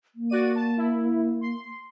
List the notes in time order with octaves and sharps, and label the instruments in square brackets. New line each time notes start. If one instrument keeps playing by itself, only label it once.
[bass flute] A#3
[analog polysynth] F#4 D5 D#7
A5
E4
C6